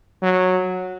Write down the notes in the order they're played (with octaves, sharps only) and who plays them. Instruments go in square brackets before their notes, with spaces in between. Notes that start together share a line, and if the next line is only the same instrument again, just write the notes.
[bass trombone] F#3